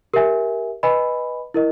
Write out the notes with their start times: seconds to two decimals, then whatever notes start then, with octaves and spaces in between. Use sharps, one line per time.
0.14 G4 A#4 E5 G#5
0.83 B4 D#5 G#5 B5
1.54 E4 A#4 D#5